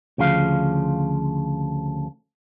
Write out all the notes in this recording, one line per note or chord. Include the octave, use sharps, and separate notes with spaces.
D2 C#3 F3 F5